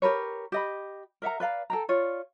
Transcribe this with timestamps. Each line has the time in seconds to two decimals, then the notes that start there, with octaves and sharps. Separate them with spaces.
0.02 G4 A#4 B4 C#5
0.52 G4 D#5 B5
1.22 A#4 E5 F#5 A#5
1.40 B4 D5 F5 A#5
1.70 A4 G5 A#5
1.89 F4 C#5 D5